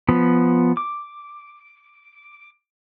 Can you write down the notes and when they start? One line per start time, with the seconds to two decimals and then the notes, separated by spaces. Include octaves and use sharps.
0.09 F3 B3
0.77 D6